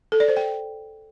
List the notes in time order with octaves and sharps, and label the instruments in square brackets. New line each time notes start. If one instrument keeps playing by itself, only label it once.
[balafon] A4
D5
C5
G5